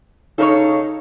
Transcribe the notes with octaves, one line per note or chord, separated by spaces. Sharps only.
C#3 D#4 A4 A#4 C#5